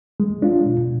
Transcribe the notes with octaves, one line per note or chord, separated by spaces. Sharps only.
G#3
D4 F4
B2